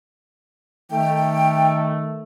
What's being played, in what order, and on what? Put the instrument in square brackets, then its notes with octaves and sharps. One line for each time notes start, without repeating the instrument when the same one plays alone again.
[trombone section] D#3 A3 [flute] G5